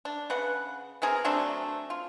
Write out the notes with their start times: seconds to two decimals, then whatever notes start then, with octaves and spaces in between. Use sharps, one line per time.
0.05 D4
0.30 C#3 B4 F#5
1.02 B3 C4 G#4 A#4
1.25 F#3 A3 C4 D4
1.90 F4